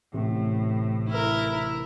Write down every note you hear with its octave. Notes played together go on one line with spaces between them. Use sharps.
A1 A2 C3
E4 A#4